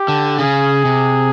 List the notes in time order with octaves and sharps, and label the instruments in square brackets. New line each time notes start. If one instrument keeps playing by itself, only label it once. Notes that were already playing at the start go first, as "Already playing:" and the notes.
Already playing: [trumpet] G4
[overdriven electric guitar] D3
[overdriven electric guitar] C#3 [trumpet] G#4
[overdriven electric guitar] C3